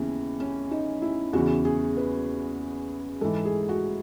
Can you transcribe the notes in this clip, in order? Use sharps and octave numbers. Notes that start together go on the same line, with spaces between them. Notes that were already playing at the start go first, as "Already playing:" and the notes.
Already playing: D#2 C#3 E3 B3
C#4
D#4
E4
E2 C#3 E3 F#4
G#4
B4
G#2 E3 A4
G#4
F#4